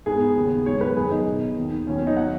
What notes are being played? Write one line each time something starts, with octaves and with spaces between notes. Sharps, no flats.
G#2 G#3 B3 G#4
D#2 C#3 B3
G#2 F#3 B3 C#5
B4
F#2 D#3 B3 G#4
D#4
B2 B3
D#2 D#3 B3
D#2 D#3 F#3 B3 C#4
C#4
D#4
F#3 B3 F#5